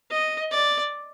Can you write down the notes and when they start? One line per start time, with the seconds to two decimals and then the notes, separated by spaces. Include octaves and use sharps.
0.11 D#5
0.51 D5